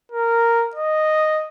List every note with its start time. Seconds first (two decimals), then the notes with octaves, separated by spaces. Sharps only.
0.12 A#4
0.75 D#5